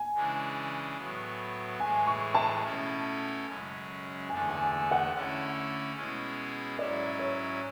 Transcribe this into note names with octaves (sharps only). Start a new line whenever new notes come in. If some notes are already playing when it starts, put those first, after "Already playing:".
Already playing: G#5
C#3 E3 G#3 D4
A2 F#3 B3
A2 E3 G#3 G#5
C#6
A5
B2 A3 C#4 E4
F#2 C#3 G#3
E2 D3 A3 D4 G#5
G#5
G#5
F#5
D3 A3 C#4 E4
B2 G#3 C#4 E4
G#2 F#3 C#4 E4 D5
C#5